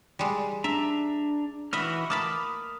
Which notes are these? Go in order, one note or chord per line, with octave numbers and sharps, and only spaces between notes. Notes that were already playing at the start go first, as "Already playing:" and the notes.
G3 G#3
D4 E5 A#5
E3 F#4 D#5 E5 B5 F6
A#3 A5 B5 D6 D#6 F6